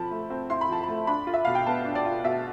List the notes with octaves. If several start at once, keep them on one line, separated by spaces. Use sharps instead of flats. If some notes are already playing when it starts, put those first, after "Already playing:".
Already playing: F3 C4 A5 B5
A3
C4
E4 C6
B5
F3 A5
A3 B5
D4 B5
F4
E5
B2 F5
G5
B3 A5
D4
D5
F4
B2 E5